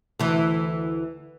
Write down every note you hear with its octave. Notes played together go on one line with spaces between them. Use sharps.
D2 E3